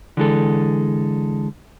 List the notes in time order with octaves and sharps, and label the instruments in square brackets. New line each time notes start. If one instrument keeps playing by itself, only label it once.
[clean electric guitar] D3 E3 G#3 A4